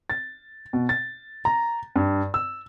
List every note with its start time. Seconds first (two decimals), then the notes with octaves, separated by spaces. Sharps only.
0.10 A6
0.73 B2
0.89 A6
1.45 A#5
1.96 G2
2.34 E6